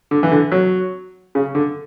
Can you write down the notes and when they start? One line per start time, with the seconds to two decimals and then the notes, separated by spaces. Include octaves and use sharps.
0.11 D3
0.23 E3
0.31 D3
0.52 F#3
1.35 C#3
1.55 D3